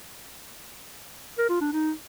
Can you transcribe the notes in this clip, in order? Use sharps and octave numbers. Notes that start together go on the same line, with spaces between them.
A#4
F4
D4
D#4